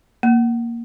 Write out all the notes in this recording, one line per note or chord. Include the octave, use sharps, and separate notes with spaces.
A#3